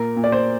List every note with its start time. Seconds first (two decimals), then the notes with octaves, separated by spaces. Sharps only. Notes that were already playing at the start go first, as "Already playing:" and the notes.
Already playing: A#2 A#4
0.16 A#2
0.24 D5
0.32 C5